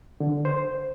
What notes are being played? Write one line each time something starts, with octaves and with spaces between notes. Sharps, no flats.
D3
C5